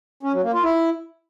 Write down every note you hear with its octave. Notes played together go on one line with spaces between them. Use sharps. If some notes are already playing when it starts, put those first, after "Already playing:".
C#4
F#3
A#3
F4
E4